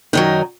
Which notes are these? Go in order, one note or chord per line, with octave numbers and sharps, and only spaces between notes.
F#2 D#3 F#3 D#4